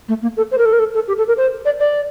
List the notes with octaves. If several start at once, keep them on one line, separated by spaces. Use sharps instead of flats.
A3
A#3
A4
C5
A#4
A4
A#4
A4
A4
G4
A4
A#4
C5
D5
D5